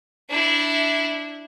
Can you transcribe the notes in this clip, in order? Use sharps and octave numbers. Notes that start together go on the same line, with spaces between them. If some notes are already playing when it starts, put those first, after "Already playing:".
D4 E4